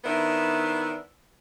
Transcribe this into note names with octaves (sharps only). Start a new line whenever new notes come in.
D#3 B3 D4 E4 C5 E5